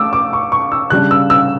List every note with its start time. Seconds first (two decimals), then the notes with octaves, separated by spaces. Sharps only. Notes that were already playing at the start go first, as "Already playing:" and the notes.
Already playing: A3 D6 E6
0.13 D6
0.33 C#6
0.52 C#6
0.72 E6
0.90 C#3 G3 D4 F#6
1.11 E6
1.30 E6